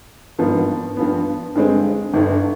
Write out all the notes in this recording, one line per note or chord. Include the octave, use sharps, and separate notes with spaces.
G#1 G2 F3 B3
G2 F3 B3
G2 D3 G#3 C4
G1 G2 D3